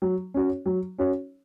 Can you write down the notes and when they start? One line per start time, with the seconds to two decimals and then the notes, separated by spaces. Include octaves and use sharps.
0.02 F#3
0.34 C#4 F#4 C#5
0.66 F#3
0.99 C#4 F#4 C#5